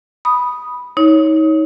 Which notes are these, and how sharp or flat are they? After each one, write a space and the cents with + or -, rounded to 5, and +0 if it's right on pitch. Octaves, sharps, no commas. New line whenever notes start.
B5 -5 D#6 +0
D#4 +30 C#5 +0